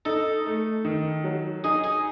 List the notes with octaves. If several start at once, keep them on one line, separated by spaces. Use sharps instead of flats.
D#4 A4
A3
D#3
F#3
D#4 G#4
G#4